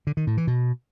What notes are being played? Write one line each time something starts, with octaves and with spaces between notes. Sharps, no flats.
D3
D#3
A2
E3
B2